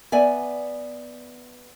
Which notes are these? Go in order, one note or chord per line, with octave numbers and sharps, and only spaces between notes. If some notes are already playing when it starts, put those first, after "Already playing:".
B3 D5 E5 G#5